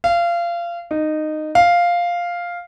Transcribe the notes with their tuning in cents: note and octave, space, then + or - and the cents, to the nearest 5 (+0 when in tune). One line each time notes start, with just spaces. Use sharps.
F5 -25
D#4 -15
F5 +0